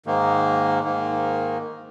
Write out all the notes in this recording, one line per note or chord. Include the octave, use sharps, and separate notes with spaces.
G#2 D#3 A#3
G#2 D#3 A#3